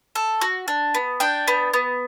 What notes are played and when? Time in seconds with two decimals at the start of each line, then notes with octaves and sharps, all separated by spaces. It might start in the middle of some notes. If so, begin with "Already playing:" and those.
0.15 A4
0.41 F#4
0.68 D4
0.95 B3
1.20 D4 G5
1.48 B3
1.73 B3